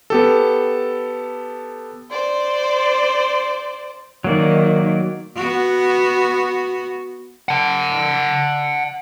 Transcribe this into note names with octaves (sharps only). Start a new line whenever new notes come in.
B3 G4 A4
C5 D5
D#3 F#3 A#3 D5
B3 F#4
F#5 A5